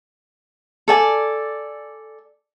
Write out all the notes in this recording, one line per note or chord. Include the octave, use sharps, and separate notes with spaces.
A4 D5 G#5